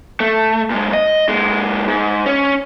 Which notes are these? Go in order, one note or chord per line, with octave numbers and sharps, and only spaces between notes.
A3
A#2 G#3
D#5
A#2 G#3
G#2
C#4